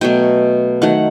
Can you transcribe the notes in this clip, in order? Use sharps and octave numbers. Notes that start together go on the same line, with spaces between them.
B2 F#3 A3 G5
D#3 F#3 A3 F#5